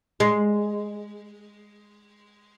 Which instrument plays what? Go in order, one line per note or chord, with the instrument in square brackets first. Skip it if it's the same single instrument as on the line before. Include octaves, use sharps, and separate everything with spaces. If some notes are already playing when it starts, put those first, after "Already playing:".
[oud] G#3